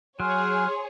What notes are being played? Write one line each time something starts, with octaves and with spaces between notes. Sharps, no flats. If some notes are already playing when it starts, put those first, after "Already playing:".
F#3 G#4 C#5 G#5 C6 F6